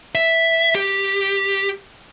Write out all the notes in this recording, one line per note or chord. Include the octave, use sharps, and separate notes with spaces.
E5
G4